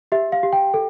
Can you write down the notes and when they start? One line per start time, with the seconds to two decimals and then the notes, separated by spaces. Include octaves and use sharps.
0.12 G4 E5
0.32 F5
0.43 G4
0.53 G5
0.74 A4